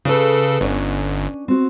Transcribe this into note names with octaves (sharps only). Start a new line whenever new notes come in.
C#3 A4 B4 C#5
G1 C#4 D4 C#5
C4 F#4